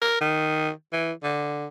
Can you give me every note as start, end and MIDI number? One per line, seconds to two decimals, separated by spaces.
0.02 0.16 70
0.21 0.70 51
0.93 1.12 52
1.23 1.67 50